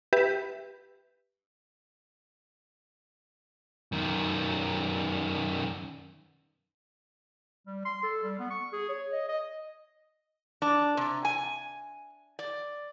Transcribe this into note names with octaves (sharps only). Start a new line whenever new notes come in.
G4 B4 E5
F#2 D#3
G3
C6
A4
G3
B3
C#6
G#4
C#5
D#5
D#5
D4
C3
G#5
D5